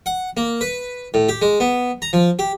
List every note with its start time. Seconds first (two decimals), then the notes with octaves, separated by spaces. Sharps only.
0.06 F#5
0.37 A#3
0.61 B4
1.14 A2
1.29 G4
1.42 G#3
1.60 B3
2.02 A#5
2.13 F3
2.39 G4